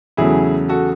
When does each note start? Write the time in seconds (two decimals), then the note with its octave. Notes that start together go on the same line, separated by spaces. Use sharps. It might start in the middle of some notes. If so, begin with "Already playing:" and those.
0.17 E2 C#3 F#3 A3 E4 G#4
0.69 F#4 A4